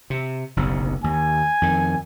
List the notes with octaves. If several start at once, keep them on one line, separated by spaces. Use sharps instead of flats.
C3
F#1 B1 C3
D#2 G#5
F2 D#3